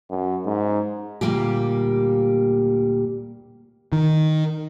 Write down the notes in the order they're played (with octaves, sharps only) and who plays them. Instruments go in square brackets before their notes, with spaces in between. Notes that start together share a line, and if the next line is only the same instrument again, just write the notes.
[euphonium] F#2
G#2
[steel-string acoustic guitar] D2 A#2 C#3 G3 A#3 G4
[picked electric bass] D#3